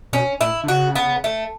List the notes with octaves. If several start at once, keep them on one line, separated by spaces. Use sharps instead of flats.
B2 C#4
A2 E4
D3
C#3 F#4
B3
A3